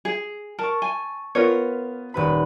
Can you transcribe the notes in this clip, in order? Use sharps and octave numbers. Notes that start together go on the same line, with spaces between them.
G#4
A#4 A5 C#6
G#5
B3 F4 A#4 B4 C#5
D#1 B4 B5